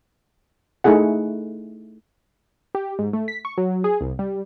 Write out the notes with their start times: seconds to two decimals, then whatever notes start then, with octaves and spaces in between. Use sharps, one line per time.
0.84 A3 D#4 E4 G#4 F#5
2.75 G4
2.99 G#2
3.13 A3
3.28 B6
3.45 C#6
3.58 F#3
3.84 G#4
4.01 C2
4.19 G3